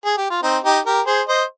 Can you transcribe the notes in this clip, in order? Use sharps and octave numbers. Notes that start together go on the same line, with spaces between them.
G#4
G4
F4
C4 D#4
D#4 G4
G4 A#4
G#4 C5
C5 D#5